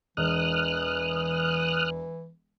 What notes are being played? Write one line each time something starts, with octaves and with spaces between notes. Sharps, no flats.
E1 E3 D#6 F6 F#6